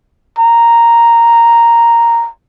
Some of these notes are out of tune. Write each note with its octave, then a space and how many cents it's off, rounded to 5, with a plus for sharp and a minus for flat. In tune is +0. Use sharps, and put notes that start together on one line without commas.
A#5 -5